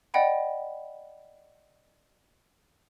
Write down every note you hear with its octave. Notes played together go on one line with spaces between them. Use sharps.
D5 D#5 F#5 G5 B5